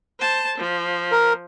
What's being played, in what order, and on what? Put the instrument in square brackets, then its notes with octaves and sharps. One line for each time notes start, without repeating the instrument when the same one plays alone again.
[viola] C5 A5
F3
[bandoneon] A#4